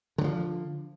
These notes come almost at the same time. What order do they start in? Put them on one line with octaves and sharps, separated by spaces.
D3 F#3 F3